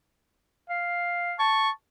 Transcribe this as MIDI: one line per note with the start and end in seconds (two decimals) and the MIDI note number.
0.70 1.34 77
1.39 1.70 81
1.39 1.70 85